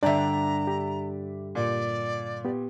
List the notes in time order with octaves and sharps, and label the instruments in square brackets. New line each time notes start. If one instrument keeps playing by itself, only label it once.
[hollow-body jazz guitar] G2 D3 [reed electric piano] D4 G5 [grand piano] D5 E5 [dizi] A#5
[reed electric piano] G4
[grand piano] A#2 [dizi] D5
[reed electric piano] B3 G4